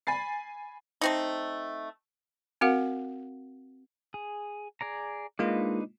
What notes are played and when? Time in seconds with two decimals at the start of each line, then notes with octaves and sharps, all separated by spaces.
0.07 G#5 B5 A6 C7
1.01 A3 C4 D#4
2.61 C4 F#4 A#4 F5 F#5
4.14 G#4
4.81 G#4 D5 A#5
5.39 G#3 A#3 D4 D#4 F4 B4